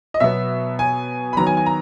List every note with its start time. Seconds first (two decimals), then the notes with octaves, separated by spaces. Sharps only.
0.14 D#5
0.20 B2 F#3 B3 E5
0.79 G#5
1.33 B5
1.37 D#3 F#3 B3 A#5
1.47 G#5
1.57 G#5
1.66 A#5